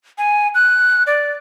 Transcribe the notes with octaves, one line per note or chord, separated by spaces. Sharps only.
G#5
F#6
D5